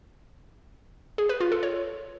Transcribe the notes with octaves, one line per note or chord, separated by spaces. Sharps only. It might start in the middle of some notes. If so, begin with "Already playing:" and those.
G#4
B4
F4
A4
C#5